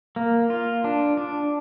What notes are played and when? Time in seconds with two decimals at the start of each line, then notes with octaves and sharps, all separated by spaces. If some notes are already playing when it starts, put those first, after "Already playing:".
0.16 A#3
0.50 F4
0.84 D4
1.17 D4